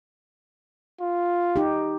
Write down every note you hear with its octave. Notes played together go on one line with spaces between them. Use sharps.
F4
D#4 G4